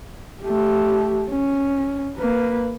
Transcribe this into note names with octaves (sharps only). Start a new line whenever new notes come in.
A3 G4
C#4
A#3 B4